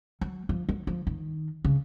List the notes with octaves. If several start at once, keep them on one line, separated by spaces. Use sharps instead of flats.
F#3
F3
F#3
F3
D#3
C#3